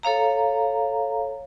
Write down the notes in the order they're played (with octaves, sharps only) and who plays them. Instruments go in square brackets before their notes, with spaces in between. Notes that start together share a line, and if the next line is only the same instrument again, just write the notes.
[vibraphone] A4 C#5 F5 A#5